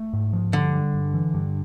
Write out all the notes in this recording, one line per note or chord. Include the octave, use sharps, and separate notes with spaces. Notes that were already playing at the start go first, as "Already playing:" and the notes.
Already playing: A3
G#2
F3
G2 D3
G3
G2
E3
G2